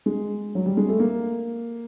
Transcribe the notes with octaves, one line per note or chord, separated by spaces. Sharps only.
G#3
F#3
G3
G#3
A3
A#3